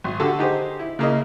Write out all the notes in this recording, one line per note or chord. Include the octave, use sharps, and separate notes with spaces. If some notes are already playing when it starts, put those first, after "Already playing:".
G#1
D3 F#4 G4 A4
D#4 G4 G#4 C5
E4
C#3 A#3 E4 D#5